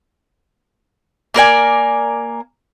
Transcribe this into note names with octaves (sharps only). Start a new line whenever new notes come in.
A#3 A#4 D5 G#5